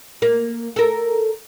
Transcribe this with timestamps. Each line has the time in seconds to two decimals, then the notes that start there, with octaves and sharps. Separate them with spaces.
0.22 A#3
0.76 A4 A#4